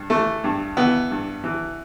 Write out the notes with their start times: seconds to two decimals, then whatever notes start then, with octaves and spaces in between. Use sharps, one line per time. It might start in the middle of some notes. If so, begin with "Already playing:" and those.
Already playing: G2
0.10 E3 A3
0.44 G2
0.77 E3 B3
1.11 G2
1.44 E3